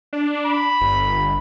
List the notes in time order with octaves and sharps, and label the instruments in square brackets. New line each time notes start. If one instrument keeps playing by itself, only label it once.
[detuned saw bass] D4
[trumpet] B5
[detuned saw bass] G1